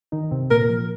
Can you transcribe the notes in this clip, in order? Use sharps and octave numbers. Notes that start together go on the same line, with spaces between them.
D#3 D#4
C3 C4
A#2 A#3 A#4
F3